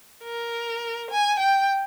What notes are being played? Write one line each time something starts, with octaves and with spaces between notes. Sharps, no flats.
A#4
G#5
G5